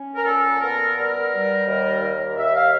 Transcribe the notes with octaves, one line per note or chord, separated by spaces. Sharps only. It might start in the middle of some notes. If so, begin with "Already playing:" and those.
Already playing: C#4
A#4
A#2 A4
B3 A#4
G3 A#4
G3
D#2
D#2
D#2 E5
F5